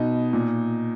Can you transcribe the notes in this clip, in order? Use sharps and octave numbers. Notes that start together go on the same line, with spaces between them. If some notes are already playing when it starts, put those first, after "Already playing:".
Already playing: B2 D#4
A#2